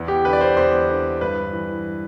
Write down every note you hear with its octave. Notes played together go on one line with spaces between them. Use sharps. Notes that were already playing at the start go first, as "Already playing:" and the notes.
Already playing: E2
G4
D3 B4
D5
C5
E2 C5
D3
G2 B4
E3